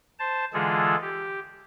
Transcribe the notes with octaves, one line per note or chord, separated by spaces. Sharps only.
C5 A5
D3 E3 G#3 F4 G#4 A4
G4